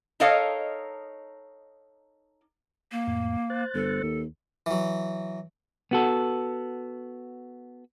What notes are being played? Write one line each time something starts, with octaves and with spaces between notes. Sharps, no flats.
D#4 A4 A#4 C#5 D#5 F5
A#3
F2 A2
C5 F#6 A6
G1 A4
D#2
E3 F#3
B3 F#4 A4